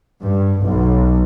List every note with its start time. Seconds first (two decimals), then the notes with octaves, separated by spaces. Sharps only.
0.23 G2
0.62 B1